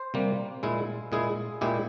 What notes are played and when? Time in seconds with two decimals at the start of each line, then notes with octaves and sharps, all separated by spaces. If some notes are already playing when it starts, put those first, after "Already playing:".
Already playing: C5
0.14 C3 G3 A#3
0.63 A#2 G#3 E4
1.12 A#2 G#3 E4 G#4
1.61 A#2 G#3 E4 G4